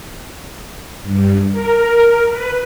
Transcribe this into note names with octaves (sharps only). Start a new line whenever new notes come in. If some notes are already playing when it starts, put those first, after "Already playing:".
G2
A#4
B4